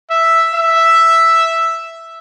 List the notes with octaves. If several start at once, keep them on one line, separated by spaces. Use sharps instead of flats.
E5
E5